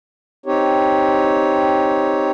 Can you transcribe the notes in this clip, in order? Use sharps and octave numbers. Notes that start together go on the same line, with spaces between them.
C4 D#4 G4 C#5